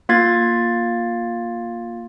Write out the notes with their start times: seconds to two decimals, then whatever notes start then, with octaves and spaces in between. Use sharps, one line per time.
0.09 A#3 F4 F5 G#6 A6